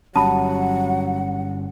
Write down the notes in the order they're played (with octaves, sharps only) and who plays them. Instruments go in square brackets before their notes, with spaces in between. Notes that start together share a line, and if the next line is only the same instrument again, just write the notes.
[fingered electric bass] G1 G3 C#4 [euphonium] F#3 [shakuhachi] F#5 [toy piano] A5 B5